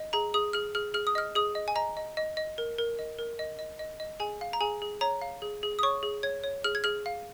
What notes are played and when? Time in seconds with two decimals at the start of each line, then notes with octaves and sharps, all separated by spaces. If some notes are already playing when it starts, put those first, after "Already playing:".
Already playing: D#5
0.13 G#4 A#5
0.34 G#4 D#6
0.53 G#4 F6
0.75 G#4 F6
0.94 G#4 F6
1.07 D#6
1.15 D#5 F6
1.35 G#4 D#6
1.55 D#5
1.68 G#5
1.75 D#5 A#5
1.97 D#5
2.17 D#5
2.37 D#5
2.58 A#4
2.78 A#4
2.99 D#5
3.19 A#4
3.39 D#5
3.59 D#5
3.79 D#5
4.00 D#5
4.20 G#4 G#5
4.41 F5
4.53 A#5
4.61 G#4 G#5
4.82 G#4
5.01 C#5 A#5
5.22 F5
5.42 G#4
5.63 G#4
5.79 D#6
5.83 C#5 C#6
6.03 G#4
6.23 C#5 G#6
6.44 C#5
6.64 G#4 F6
6.75 G#6
6.84 G#4 F6
7.06 F5